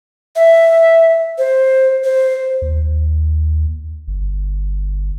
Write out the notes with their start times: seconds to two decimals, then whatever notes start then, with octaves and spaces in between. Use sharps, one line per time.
0.36 E5
1.38 C5
2.04 C5
2.62 D#2
4.08 G1